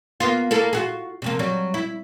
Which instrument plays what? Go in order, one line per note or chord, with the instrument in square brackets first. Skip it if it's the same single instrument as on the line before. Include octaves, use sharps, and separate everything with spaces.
[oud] A#3 B3 F4
A#3 E4 A4
F4 F#4 G#4
C3 F3 A#3
F#3 G3
E4